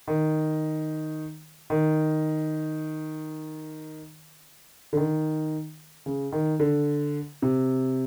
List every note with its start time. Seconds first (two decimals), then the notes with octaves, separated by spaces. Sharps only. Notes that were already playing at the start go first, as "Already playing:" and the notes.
0.08 D#3
1.70 D#3
4.93 D3
4.97 D#3
6.06 C#3
6.32 D#3
6.60 D3
7.42 C3